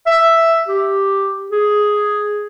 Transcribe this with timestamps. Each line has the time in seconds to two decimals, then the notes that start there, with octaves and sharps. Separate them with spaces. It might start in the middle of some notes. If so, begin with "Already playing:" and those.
0.07 E5
0.68 G4
1.52 G#4